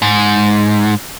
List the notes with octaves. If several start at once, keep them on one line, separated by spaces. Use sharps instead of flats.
G#2